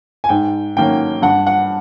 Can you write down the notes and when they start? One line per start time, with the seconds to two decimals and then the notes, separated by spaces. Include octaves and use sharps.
0.24 G#5
0.29 G#2 G5
0.77 D#3 F#3 A#3 C#4 G5
1.22 G2 F#5
1.47 F#5